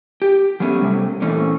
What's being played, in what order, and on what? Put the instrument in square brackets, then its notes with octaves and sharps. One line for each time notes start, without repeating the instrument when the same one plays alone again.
[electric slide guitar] G4
F#3 A3 B3 C#4
C3 G3 A3
A#2 E3 A3 C4 C#4